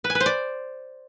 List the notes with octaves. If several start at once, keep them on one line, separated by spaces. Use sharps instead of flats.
B4
G#5
B4
C5
D5